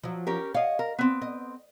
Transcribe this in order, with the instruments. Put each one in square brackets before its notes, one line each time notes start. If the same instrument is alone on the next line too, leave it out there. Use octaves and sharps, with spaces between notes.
[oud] F3 F#3
[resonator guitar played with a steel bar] C#4 G4 A#4
[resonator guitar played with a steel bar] C#5 D#5 [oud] F5
[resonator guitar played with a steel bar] A#4
B3 C4
[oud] D#5